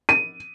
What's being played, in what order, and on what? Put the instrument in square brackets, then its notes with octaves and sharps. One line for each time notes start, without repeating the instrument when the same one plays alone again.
[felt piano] D#7